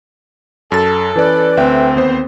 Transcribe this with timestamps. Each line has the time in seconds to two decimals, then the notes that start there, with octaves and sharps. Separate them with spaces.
0.72 F#2 A4 A6
1.16 E3 C#4 B4 D5
1.57 D2 C4 E5 G5
1.96 D#2 B3 C5